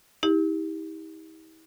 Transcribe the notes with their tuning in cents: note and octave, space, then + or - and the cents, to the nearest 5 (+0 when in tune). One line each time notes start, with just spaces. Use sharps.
E4 -45 G4 +20